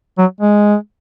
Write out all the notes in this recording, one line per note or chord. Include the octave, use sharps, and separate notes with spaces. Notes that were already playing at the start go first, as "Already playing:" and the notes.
F#3
G#3